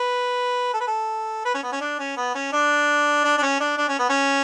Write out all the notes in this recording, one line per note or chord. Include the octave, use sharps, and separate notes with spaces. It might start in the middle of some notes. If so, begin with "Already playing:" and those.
Already playing: B4
A4
B4
A4
B4
C#4
B3
C#4
D4
C#4
B3
C#4
D4
D4
D4
C#4
D4
D4
C#4
B3
C#4